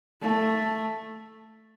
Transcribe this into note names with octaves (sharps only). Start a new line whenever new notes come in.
A3